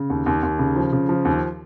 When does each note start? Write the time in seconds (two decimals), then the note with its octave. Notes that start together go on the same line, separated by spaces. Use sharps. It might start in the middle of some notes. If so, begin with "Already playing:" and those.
Already playing: C#3
0.10 D#2
0.26 D#2
0.43 D#2
0.59 C#3
0.76 F3
0.92 C#3
1.09 F3
1.25 D#2